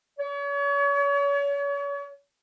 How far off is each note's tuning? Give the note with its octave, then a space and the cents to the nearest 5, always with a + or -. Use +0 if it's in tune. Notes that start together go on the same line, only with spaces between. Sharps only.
C#5 +35